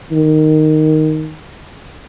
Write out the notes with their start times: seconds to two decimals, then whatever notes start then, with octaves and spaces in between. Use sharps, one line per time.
0.11 D#3